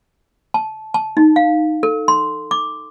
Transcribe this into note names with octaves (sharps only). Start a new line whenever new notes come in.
A5
A5
D#4
F5
A4
C6
D6